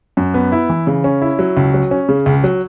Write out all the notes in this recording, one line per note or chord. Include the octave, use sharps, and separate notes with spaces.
F#2
B3
E4
E3
C#3
C#4
E4
F#3
C#2
F#3
C#4
C#3
C#2
F#3